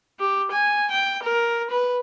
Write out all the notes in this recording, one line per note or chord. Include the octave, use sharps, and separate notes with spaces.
G4
G#5
G5
A#4
B4